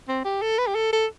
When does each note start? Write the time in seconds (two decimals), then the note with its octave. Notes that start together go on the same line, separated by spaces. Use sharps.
0.08 C4
0.24 G4
0.42 A4
0.58 B4
0.67 G4
0.75 A4
0.92 A4